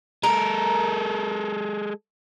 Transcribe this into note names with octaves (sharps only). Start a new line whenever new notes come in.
G#3 A4 A#4